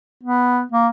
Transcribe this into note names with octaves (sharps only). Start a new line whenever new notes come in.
B3
A#3